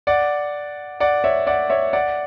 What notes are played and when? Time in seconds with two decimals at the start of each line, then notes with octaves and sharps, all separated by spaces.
0.07 D5 F#5
1.00 D5 F#5
1.24 C#5 E5
1.47 D5 F#5
1.70 C#5 E5
1.93 D5 F#5